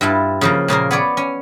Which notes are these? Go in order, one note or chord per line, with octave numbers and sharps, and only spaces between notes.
G2 E4 F4 A5
C#3 F3 A#3
A#2 C#3 A#3 A#4
B3 C#5 D5
C#4